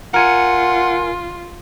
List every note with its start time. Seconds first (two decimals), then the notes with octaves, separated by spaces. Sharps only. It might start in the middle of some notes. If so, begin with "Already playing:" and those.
0.14 F4 A#4 F#5 G#5 C#7